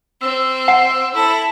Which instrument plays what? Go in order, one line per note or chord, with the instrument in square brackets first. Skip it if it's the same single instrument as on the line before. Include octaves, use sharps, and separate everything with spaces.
[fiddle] C4 [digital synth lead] E6
[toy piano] F#5
[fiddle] E4 [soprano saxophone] A4